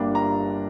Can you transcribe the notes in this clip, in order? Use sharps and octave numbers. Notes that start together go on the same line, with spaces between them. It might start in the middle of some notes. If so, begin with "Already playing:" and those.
Already playing: G1 G2 G3 A#3 D4
A#5